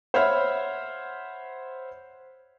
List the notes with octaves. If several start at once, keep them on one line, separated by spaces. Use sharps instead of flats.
C5 C#5 E5 F#5 B5 F6